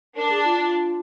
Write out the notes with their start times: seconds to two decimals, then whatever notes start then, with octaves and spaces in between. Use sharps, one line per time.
0.16 D4 A#4
0.30 G#4
0.44 F4
0.59 F4